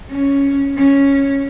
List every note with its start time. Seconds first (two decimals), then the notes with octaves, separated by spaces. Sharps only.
0.10 C#4
0.77 C#4